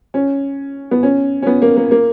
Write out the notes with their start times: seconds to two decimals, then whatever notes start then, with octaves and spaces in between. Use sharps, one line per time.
0.14 C#4
0.91 B3
1.03 C#4
1.42 C#4
1.47 B3
1.62 A#3
1.77 A#3
1.91 A#3